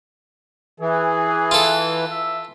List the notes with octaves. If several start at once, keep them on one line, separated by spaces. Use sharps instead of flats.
E3 G#4
F4 A4
E5